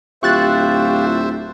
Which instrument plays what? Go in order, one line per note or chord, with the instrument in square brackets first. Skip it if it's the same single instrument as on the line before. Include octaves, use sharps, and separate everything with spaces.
[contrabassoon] D1 [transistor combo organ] F4 G4 [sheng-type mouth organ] C5 E5 [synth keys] C#6 F#6 A6